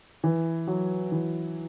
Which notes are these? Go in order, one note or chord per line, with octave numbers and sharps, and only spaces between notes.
E3
F#3
E3